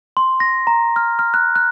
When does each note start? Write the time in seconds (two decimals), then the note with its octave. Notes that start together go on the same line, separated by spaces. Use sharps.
0.17 C6
0.40 A#6
0.67 A#5
0.96 F6
1.19 F6
1.34 F#6
1.56 F#6